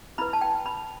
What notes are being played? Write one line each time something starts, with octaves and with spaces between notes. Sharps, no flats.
E4 B4 B5
A5
G5
B5